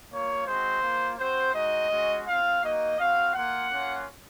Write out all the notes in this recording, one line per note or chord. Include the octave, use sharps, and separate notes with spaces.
A#3 F4 C#5
G#3 C4 F#4 C5
A#3 F4
C4 F#4 C5
G#3 D#4 F#4 D#5
G#3 C#4 F#4
C4 F4 F5
A#3 D#4 F#4 D#5
C4 F#4 F5
A#3 F4 F#5
A#3 C#4 F4